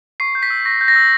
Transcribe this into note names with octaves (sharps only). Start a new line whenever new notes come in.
C#6 C7
G6
B6
E6
C#6 A#6
G6
A#6
E6